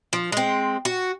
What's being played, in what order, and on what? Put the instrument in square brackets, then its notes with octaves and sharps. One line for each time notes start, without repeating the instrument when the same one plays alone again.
[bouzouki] F3
G#3 C4
F#4